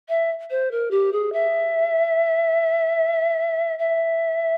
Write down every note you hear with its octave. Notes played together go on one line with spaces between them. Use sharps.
E5
C5
A#4
G4
G#4
E5
E5